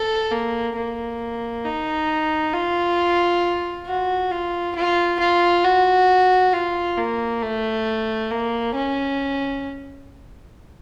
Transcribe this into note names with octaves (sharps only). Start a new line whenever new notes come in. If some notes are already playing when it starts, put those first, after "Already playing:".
Already playing: A4
A#3
A#3
D#4
F4
F#4
F4
F4
F4
F#4
F4
A#3
A3
A#3
C#4